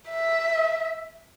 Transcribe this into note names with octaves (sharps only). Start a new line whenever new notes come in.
E5